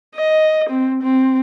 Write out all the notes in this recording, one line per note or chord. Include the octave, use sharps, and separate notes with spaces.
D#5
C4
C4